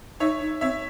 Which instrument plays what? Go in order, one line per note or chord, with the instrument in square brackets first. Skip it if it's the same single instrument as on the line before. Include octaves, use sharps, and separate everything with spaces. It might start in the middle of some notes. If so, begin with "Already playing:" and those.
[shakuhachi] D#4 [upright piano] C#5 E5
[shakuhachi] D#4
[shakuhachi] C4 [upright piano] C#5 E5